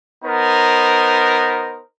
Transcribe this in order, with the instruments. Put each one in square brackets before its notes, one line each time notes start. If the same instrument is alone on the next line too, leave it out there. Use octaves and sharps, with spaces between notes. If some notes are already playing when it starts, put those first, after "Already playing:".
[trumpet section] B3 D#4 A#4 C5